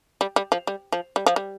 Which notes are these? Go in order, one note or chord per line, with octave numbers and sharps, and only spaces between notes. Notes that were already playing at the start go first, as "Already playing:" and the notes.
G3
G3
F3
G3
F3
G3
F3
G3